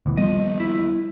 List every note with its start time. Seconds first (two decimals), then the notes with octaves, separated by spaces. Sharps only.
0.06 D2 B2 E3
0.17 D#2 F3 G3 B3 D#5
0.60 E4